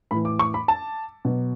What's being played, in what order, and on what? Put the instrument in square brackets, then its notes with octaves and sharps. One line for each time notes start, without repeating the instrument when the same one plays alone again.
[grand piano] A2 E3 B5
D6
C#6
B5
A5
B2 F#3